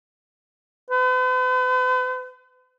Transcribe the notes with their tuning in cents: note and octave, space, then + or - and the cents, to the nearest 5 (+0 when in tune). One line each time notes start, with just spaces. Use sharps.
B4 +45